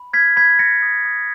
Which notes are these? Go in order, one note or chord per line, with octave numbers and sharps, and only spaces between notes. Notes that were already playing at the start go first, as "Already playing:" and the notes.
Already playing: B5
F6 G#6 B6
B5 G#6 B6
B5 A#6 C#7
D#6
D#6